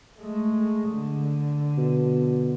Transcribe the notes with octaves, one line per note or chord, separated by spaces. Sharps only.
G#3 A3
D3
B2